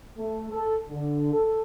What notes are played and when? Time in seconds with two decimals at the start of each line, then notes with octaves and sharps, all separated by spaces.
0.16 A3
0.51 A4
0.89 D3
1.33 A4